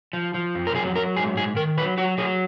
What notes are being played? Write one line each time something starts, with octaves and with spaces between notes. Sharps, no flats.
F3
F3
F2
A#4
F#3 G#4
F#3 A#4
G#2 G#4
G#2 G#4
D#3 A#4
F#3 B4
F#3 F#4
F#3 G#4